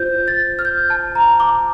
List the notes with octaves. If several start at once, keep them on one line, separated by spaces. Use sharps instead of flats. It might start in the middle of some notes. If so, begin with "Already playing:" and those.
Already playing: F4 C5 G6
A6
F6
G6
A5
A#5
D6